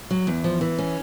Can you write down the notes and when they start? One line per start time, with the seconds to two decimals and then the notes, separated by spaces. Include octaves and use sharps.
0.11 F#3
0.27 E2
0.44 F3
0.61 E3
0.79 C#4